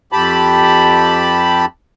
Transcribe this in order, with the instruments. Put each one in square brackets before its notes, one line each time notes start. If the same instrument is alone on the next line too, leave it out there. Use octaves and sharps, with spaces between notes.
[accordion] F2 G4 A5 B5